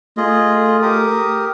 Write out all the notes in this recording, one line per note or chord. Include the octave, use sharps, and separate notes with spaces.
A3 F4 G#4 D#5
G4 A#4 D#6